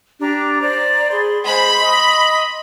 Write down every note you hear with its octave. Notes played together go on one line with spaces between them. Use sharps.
D4 G4 A#5
C5 D5 A#5
G#4 B5 C6
G#3 C5 B5
D#5 C6